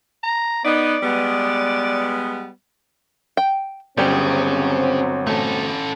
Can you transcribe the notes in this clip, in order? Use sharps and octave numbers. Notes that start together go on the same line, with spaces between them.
A#5
B3 D#4 D5
G3 G#3 B3
G5
G1 C#3 F#3 G3 C4 G4 G#4
A3 C#4 A4